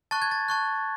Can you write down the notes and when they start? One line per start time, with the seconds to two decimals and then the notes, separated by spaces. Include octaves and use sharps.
0.11 A5 C#6 F#6 A6
0.22 G#6
0.31 A6
0.48 A5 C#6 F#6